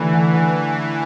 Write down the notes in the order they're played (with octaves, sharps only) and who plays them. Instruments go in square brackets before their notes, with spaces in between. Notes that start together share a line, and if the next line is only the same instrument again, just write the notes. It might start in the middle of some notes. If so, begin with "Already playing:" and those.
Already playing: [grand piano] D3 A3 E4 [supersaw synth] E3
[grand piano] D3
D3